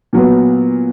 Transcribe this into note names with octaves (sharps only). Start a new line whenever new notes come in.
A#2 F#3 B3